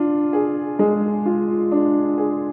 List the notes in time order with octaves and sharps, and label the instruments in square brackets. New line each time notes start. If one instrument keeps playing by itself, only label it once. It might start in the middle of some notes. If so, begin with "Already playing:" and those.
Already playing: [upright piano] D4 F4
G#4
G#3
F4
D4
G#4